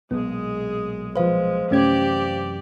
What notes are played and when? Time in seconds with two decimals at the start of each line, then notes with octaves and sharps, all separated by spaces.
0.11 B1 A#2 G#3 B3 G#4
1.16 F3 G#3 B4 C5 F5
1.71 F#2 C3 E3 A3 C#4 G4 D5 G#6